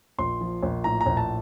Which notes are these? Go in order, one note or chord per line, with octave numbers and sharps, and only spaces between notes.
A#1 C6
F3
A#1
A2 A#5
A#5
A#1
A5